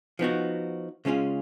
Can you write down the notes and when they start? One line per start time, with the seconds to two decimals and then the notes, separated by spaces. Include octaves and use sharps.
0.19 F3 B3 D#4 F#4
1.05 C#3 G#3 C#4 F4